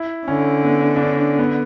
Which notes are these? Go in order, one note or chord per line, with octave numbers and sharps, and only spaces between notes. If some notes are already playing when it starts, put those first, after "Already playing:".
Already playing: E4
D3 C#4
B3
D4
C#4
B3